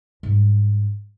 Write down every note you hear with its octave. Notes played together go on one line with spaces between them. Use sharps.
G#2 G3